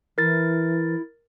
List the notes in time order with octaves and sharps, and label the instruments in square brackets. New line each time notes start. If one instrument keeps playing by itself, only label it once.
[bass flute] E3 [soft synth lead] E4 [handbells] A#4 A6